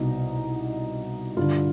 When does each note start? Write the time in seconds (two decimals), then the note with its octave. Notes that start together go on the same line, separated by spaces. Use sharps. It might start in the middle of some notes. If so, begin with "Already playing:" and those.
Already playing: C2 B2 D#4
1.37 G2 D3 F4